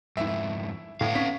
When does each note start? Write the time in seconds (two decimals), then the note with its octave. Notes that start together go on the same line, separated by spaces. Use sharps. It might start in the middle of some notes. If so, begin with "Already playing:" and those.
0.17 F2 G#2 E4 E5
1.01 A2 B3 F5
1.15 C#4 B6